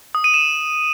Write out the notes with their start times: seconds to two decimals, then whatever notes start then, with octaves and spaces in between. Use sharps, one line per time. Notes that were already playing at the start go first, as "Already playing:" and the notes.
0.15 D#6
0.24 D#7
0.34 E7